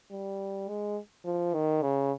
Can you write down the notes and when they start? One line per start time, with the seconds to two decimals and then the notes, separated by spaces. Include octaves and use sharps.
0.11 G3
0.69 G#3
1.25 F3
1.54 D#3
1.82 C#3